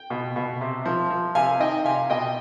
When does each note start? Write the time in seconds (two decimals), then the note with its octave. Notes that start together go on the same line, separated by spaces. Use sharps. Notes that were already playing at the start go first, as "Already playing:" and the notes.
Already playing: G5
0.10 B2
0.36 B2
0.61 C3
0.85 F3
1.10 F3
1.35 C3 F5 G#5
1.60 D#3 D#5 G5
1.85 C3 F5 G#5
2.10 B2 D#5 G5